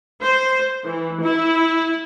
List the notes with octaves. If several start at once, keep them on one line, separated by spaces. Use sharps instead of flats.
C5
E3
E4